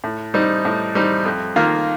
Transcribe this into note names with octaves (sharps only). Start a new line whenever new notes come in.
A2
G3 C4 D#4
A2
G3 C4 D#4
F2
D#3 A#3 F4